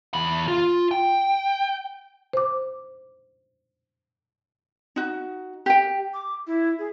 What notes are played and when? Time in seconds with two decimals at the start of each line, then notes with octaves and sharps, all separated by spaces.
0.14 E2 B5
0.48 F4
0.91 G5
2.33 C5 D6
4.96 D#4 F#4
5.66 G4 G5
6.14 D6
6.47 E4
6.79 G#4